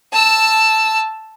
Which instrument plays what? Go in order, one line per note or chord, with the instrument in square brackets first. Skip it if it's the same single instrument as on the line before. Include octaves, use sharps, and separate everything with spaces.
[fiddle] A5 E6